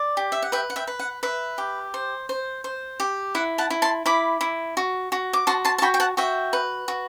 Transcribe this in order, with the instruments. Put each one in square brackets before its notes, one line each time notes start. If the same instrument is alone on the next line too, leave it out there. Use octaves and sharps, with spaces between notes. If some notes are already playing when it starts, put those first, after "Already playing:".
Already playing: [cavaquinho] D5
G4
E5
F#5
B4 E5 G5
F#5
E5 G5
B4
F#5
B4 E5
G4
C5
C5
C5
G4
E4 F#5
F#5 A5
E4
A5 C6
E4 B5 D6
E4
F#4
F#4
D6
F#4 A5 C6
A5 C6
A5
F#4 G5 B5
G5
F#5 A5
F#4 E5 G5
B4
F#4